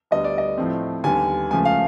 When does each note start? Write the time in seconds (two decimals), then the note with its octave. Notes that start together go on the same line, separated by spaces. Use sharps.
0.11 D2 D3 G3 B3 D#5
0.24 D5
0.38 D#5
0.58 A2 F3 A3 C4
1.04 D#2 D3 G3 B3 G#5
1.51 C#2 C#3 F3 A3 G#5
1.65 F5